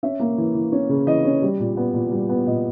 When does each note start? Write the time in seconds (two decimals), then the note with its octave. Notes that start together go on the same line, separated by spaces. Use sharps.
0.03 C#4 E5
0.20 A#3
0.38 E3
0.55 E3
0.72 C#4
0.89 C#3
1.07 E3 D#5
1.25 C#4
1.42 G3
1.60 A#2
1.77 B3
1.94 A#2
2.12 G3
2.29 B3
2.47 A#2 D#5